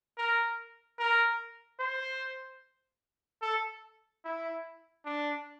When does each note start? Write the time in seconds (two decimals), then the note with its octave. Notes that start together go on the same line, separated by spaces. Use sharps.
0.18 A#4
0.99 A#4
1.80 C5
3.42 A4
4.24 E4
5.05 D4